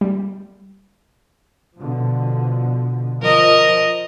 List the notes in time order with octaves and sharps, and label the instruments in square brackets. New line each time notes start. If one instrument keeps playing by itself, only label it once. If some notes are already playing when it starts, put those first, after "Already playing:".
[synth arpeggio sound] G3
[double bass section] B2 D3 F3
[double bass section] F3 [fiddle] A#4 D#5